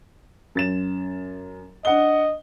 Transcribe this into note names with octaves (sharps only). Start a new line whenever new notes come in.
F#2 A6 E7
D4 D#5 F#5 G7